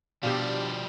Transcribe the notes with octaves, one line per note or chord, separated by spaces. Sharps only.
B2 F3 G3 D4 G4 F5 E6